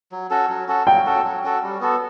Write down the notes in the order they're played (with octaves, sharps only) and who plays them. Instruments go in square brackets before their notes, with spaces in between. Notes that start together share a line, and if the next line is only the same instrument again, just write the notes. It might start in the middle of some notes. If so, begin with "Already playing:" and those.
[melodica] F#3
C#4 F#4 A4
F#3
C#4 F#4 A4
[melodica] F#3 [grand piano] G5
[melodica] C#4 F#4 A4
F#3
C#4 F#4 A4
G3
B3 F#4 A4